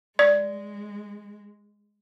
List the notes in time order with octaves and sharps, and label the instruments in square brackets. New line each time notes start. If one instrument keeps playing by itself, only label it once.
[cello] G#3 [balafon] D5